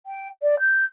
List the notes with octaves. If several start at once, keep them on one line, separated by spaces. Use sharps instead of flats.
G5
D5
G6